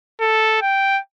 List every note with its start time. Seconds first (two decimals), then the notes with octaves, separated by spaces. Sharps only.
0.20 A4
0.62 G5